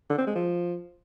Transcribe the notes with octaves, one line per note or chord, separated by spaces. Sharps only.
D3
C4
G#3
F3